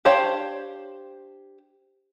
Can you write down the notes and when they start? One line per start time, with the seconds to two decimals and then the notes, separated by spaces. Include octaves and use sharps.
0.05 D4 G4 C5 C#5 F5